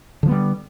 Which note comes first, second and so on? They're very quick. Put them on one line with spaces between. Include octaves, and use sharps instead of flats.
D3 F3 B3 G3